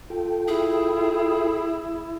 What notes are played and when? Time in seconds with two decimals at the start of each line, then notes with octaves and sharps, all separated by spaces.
0.10 F4 A4 G5
0.48 E4 G#4